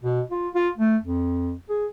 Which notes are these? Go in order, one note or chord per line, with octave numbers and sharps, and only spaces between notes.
B2
F4
F4
A3
F2
G#4